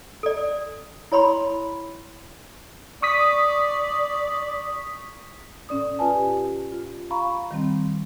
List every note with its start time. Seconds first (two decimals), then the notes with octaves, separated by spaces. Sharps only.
0.23 A4 D5
1.12 E4 C#5 B5 C6
3.02 D5 C#6 D#6 B6
5.69 A2 C#4 D5 D#6
5.99 C#4 F4 B4 D5 G#5 A5
6.15 G4
6.72 F4
7.11 F5 A#5 B5 C#6
7.51 D#3 G3 C4